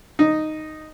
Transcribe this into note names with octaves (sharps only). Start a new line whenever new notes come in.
D#4